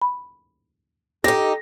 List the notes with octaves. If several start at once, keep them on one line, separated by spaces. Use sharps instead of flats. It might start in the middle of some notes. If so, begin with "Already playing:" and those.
B5
D#4 G4 A4 A#6